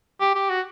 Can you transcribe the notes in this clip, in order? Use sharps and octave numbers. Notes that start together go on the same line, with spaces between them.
G4
G4
F#4